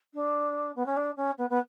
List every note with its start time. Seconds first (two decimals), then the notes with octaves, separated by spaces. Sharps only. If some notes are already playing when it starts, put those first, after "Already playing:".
0.14 D4
0.75 B3
0.86 C#4
0.96 D4
1.16 C#4
1.38 B3
1.49 B3